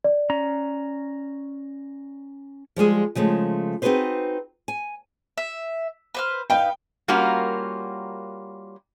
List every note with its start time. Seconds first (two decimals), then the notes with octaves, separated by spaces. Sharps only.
0.04 D5
0.30 C#4 A#5
2.76 F3 G3 G#3 G#4
3.15 C#3 F3 G#3 A3
3.82 C4 D#4 F#4 G#4 B4 C5
4.68 G#5
5.38 E5
6.15 B4 C5 F6
6.50 D#4 B4 F5 G5
7.08 G3 A#3 C#4 F4 F#4 A#4